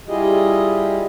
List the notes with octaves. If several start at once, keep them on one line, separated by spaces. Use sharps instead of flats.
G3 E4 F4 G4 G#4 D#5